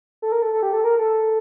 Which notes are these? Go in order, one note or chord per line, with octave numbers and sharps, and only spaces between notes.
A4
A#4
A4
A4
G4
A4
A#4
A4